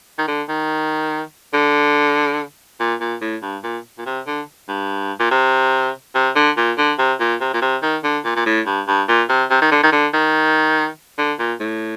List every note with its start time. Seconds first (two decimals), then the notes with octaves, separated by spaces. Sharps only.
0.18 D#3
0.27 D3
0.49 D#3
1.54 D3
2.80 A#2
3.00 A#2
3.21 A2
3.42 G2
3.63 A#2
3.98 A#2
4.05 C3
4.26 D3
4.68 G2
5.19 A#2
5.31 C3
6.15 C3
6.35 D3
6.57 A#2
6.78 D3
6.99 C3
7.20 A#2
7.40 C3
7.53 A#2
7.62 C3
7.82 D#3
8.04 D3
8.24 A#2
8.36 A#2
8.46 A2
8.66 G2
8.87 G2
9.08 A#2
9.29 C3
9.50 C3
9.61 D#3
9.71 D3
9.83 D#3
9.92 D3
10.13 D#3
11.18 D3
11.39 A#2
11.60 A2